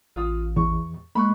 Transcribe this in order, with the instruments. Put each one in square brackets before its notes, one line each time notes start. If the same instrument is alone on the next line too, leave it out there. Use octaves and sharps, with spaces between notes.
[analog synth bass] A1 [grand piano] F4 F5 D#6
[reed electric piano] E2 [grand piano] C#6
[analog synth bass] G#3 [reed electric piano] A#3 [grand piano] B5 C#6 F#6